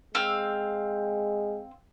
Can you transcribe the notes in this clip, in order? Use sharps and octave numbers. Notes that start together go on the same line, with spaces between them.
G#3 C4 F5 E6